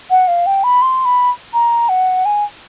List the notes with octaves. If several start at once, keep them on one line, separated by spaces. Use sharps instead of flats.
F#5
F5
G5
B5
C6
B5
A#5
F#5
G#5